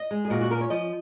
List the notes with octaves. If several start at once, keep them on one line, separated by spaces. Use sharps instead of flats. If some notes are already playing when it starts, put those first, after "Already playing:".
Already playing: D#5
G#3
G#4
A#2 F#4
F#4
C#4 A#4
C#5
F3 D#5